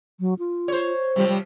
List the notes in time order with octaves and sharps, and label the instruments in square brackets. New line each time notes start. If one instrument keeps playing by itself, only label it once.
[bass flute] F#3
F4
[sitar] C5 C#5
[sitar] C3 F3 [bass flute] G3
[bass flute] G3